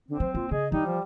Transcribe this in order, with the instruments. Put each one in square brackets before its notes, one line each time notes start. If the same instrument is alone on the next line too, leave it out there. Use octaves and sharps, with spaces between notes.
[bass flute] D3 [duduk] C4
[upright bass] F#3 [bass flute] C5
[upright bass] A#3 [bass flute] F4
[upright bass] C#3 [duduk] G#4 [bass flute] D#5
[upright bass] E3 [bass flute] G3 [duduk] D#4
[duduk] F3